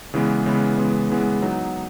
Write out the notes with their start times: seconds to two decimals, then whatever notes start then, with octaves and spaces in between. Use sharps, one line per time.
0.14 C#3 E3 G#3 B3
0.46 C#3 E3 G#3 B3
0.78 C#3 E3 G#3 B3
1.10 C#3 E3 G#3 B3
1.42 F#3 B3 D#4